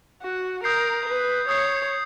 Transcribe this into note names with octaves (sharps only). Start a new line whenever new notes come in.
F#4
A#4 D#6 G6 C7
B4
C#5 D#6 G6 C7